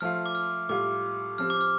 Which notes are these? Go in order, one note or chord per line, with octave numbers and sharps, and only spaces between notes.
F3 A3 F4 F6
D6
F6
A2 G3 F4 D6
F3 C4 G4 F6
D6
F6